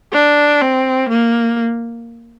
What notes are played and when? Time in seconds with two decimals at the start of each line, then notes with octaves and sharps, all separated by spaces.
0.13 D4
0.62 C4
1.09 A#3